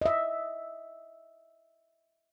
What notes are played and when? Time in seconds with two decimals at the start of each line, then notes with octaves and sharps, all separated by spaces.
0.02 D#5 E5